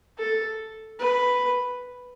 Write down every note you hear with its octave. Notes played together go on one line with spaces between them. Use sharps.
A4
B4